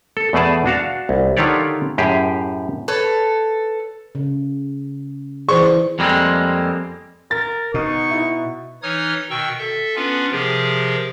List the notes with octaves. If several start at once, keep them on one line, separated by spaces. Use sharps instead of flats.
A4
E2 B2 A3 G#4 D5 A5
D4 F#4 F5 A5
C2
D3 D#3 F4 G4 C#5 D5
F#2 A2 G4 G#4
A4 B4 C#5
C#3
E3 G#4 C5 D5 C#6
F2 G3 G#3 A#3 C4
A#4 A6
B2 D#4 C#6
E4
E3 D#4 C#5 D#6 F6 G#6
B2 D#3 G5 C#6 E6
A4 E5
B3 C#4 D4 F4 B4
C3 F3 G4 G#4 A#4